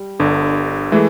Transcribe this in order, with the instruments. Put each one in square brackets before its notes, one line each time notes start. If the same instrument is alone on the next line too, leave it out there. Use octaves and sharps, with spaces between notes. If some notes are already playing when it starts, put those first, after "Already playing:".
Already playing: [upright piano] G3
[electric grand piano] G1 G2 D3
[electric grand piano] E3 A3 [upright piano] G#3